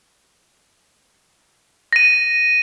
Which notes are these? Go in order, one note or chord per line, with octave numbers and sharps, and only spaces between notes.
A#6 D#7